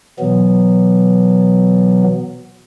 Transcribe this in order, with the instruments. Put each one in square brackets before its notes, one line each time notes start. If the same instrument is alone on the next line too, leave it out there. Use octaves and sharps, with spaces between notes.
[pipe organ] B2 E3 F#3 B3